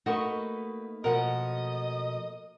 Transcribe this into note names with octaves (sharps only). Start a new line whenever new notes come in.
A3 A#3 D#4 F#4 B4 D#5 C#6
B2 F3 A#4 D#5 F#5